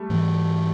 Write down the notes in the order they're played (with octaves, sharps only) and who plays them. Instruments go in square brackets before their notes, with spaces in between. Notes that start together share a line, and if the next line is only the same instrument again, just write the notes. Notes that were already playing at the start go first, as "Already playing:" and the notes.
Already playing: [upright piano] G3 A3
[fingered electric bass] G#2 E3 G#3